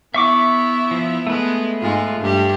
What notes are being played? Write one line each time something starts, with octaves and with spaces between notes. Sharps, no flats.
B3 E4 E5 C#6 D6
F3
G#3 A3 B3 B4
G#2 G#3 F4
G2 G4